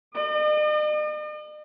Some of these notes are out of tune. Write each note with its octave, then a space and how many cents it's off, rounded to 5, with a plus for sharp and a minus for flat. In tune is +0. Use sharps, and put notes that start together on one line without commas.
D#5 -45 D6 +40